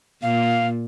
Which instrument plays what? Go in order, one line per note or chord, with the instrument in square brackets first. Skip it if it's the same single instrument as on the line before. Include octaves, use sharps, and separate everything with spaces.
[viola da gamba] A#2 [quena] F5